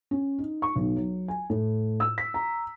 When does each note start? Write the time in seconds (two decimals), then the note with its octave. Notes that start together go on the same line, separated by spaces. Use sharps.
0.11 C#4
0.38 D#4
0.62 C#6
0.76 B1
0.96 F#3
1.28 G#5
1.50 A2
2.00 E6
2.18 B6
2.34 A#5